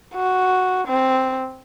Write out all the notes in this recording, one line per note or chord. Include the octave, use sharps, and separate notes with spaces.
F#4
C4